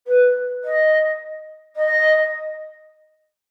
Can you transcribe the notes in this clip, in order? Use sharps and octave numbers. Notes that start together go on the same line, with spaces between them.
B4
D#5
D#5